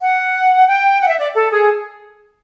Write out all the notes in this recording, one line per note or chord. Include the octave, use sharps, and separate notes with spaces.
F#5
G5
F#5
E5
D5
A4
G#4